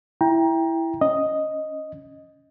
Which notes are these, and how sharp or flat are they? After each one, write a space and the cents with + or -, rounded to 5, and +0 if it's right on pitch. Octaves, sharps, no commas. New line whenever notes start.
E4 +0 G5 +15 A#5 +20
C#4 +0 D#5 +0